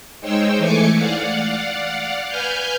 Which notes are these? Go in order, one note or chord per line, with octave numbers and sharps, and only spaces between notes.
G#3 D#4 C5 C#5 G5 E6
E3 A3 G#5 D6 C#7
D5 F5 F#5
B4 G#5 F6 G6